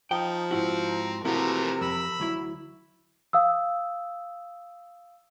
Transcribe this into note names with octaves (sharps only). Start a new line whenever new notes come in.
F3 D#4 G5
G#2 C4 E4 F#4
A#5
C3 E3 F3 A3 A#3 E4 F#4 A#4
F2 B5 E6
D2 F#3 E4
F5 D#6 E6